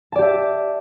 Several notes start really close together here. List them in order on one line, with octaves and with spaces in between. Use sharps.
A5 D5 G4 E5